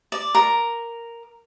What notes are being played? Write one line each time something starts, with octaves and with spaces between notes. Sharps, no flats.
D5
A#4